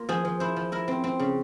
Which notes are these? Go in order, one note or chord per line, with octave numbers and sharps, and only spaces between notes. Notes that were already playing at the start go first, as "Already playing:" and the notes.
Already playing: A#3 F4
F3 G#4
F3
E4 C5
F3
E4 A#4
C4
C4
C#3